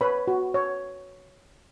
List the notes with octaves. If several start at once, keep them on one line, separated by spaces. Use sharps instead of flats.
B4 C#5 B5
F#4
C#5